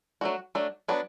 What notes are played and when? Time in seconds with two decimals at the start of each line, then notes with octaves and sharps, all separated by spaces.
0.21 F#3 A3 D4 F#4
0.55 F#3 A3 D4
0.88 F#3 B3 D4